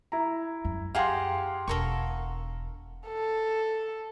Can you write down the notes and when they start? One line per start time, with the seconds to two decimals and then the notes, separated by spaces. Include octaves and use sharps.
0.12 E4 A#5
0.64 F#2
0.95 G4 G#4 F5 F#5 A#5 C6
1.68 E1 A4 A#4 C#6
3.08 A4